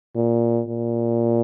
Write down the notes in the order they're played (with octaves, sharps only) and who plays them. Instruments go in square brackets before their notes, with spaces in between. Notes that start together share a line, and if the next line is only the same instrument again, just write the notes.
[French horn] A#2
A#2